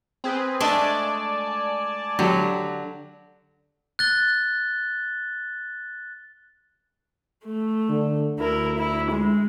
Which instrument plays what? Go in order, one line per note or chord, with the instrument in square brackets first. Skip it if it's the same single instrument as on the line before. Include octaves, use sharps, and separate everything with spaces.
[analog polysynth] C4 G#4 B4
[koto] G#3 A3 D4 [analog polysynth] D5 G#5 A5
[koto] D3 [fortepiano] F#3 G4
[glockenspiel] F#6 A6 G7
[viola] A3
[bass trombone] D3
[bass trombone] D2 [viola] E4 A#4
[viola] E4
G#3